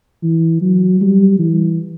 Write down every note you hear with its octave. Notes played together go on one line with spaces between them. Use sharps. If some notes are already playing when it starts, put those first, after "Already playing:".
E3
F#3
G3
E3